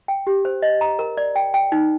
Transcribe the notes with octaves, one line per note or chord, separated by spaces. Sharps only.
G5
G4
C5
D#5
A#5
A#4
D5
G5
G5
D#4